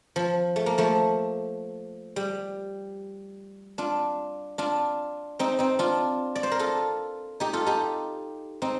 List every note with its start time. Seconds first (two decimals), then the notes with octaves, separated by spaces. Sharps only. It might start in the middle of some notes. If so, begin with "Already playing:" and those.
0.16 F3
0.56 A3
0.66 A#3
0.78 F3 A3
2.16 G3
3.78 D4 F4
4.58 D4 F4
5.39 C4 D#4
5.59 C4 D#4
5.79 D4 F4
6.35 D5
6.43 C5
6.51 A#4
6.59 F4 A4
7.40 D#4 G4
7.53 F4 A4
7.66 D#4 G4
8.62 C4 D#4